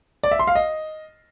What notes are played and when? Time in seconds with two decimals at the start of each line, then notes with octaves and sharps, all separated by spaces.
0.23 D5
0.31 E5
0.39 C6
0.47 F5
0.55 D#5